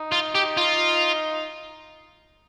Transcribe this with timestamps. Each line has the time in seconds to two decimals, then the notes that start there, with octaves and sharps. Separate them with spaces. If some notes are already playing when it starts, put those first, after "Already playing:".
Already playing: D#4
0.12 F4
0.35 G4
0.57 F4